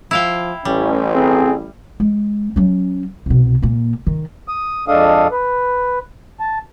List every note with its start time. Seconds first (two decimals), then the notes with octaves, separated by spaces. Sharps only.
0.11 F3 E4 F5 G5
0.65 A1 G3 C#4
1.15 C4 G#4
2.00 G#3
2.56 F#3 C#4
3.26 C2 B2
3.62 A#2 A#3
4.07 D#3
4.48 D#6
4.88 F2 G#3 D4 A4 F5 D#6
5.31 B4
6.40 A5